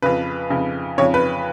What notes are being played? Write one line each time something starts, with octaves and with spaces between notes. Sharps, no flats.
F2 C#3 B4
F2 C#3
F2 C#3 C#5
B4